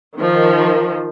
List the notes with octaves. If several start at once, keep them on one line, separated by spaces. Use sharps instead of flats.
D#3 F3